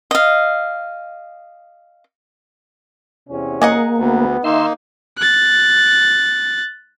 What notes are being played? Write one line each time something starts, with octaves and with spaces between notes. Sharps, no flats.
D#5 F5
E2 C3 C#4
A#3 G#4 D#5 F#5
D2 B3
D#3 A#3 D#4 E5 C6
F#6 A6